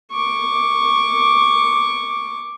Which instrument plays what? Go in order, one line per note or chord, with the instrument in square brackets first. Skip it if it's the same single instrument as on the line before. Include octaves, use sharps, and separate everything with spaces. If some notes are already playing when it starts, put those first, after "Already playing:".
[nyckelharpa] C#6 D6